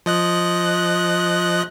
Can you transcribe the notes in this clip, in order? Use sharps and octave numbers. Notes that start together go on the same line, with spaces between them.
F3 D#5 F#6